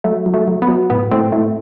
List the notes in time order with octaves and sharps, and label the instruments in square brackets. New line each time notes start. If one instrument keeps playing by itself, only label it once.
[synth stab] F#3 A3
F#3
A3
F#3
B3
F#3
A2 B3
A2 A3 C4
A2 A3